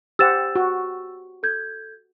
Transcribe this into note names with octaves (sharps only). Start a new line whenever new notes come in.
G4 C5 F#5 E6 A6 E7
F#4
A4 G6 G#6